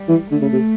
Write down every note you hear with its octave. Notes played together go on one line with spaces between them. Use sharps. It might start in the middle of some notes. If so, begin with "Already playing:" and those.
Already playing: G3
E3
D3 A3
C#3
C3